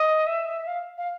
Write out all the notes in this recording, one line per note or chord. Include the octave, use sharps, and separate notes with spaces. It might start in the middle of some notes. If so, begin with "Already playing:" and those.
Already playing: D#5
E5
F5
F5